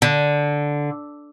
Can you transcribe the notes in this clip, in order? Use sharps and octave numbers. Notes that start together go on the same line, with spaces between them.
D3